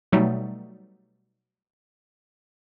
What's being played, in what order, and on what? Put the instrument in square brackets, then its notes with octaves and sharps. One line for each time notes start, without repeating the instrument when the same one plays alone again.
[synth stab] B2 F#3 G3 A3 D#4